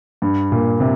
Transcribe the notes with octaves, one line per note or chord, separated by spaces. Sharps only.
G2
A#2
C3